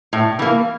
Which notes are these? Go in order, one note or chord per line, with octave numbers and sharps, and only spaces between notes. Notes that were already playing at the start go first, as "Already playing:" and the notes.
A2
E3 A#3